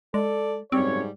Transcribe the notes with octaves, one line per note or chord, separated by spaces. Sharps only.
G#3 A4 D5
F#1 G#2 G3 C4 C#5